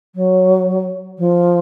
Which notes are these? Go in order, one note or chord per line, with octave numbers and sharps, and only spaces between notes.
F#3
F3